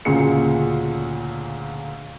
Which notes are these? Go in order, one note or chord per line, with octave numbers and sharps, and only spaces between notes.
D2 A#2 C#3 G#4 C#7